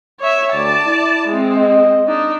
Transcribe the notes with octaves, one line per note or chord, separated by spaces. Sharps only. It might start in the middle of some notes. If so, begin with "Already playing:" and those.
C#5 E5
D2 D5 A5
E4
G#3 C4
D#5
D4 D#4